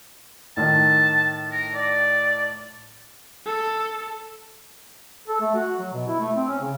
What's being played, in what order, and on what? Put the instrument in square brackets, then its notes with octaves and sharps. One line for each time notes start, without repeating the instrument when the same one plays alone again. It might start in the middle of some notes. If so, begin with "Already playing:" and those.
[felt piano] A2 D#3 [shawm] A5
[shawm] A#4
D5
[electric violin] A4
[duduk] A4
A3
F#4
F#3
B2
E4
A3
C4
C#4
C#3